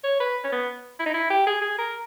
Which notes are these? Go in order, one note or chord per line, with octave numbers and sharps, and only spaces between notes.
C#5
B4
C#4
B3
E4
D#4
E4
G4
G#4
G#4
A#4